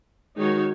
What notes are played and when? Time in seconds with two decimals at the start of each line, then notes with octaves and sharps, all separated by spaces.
0.37 D#3 G#3 D#4 F#4 C#5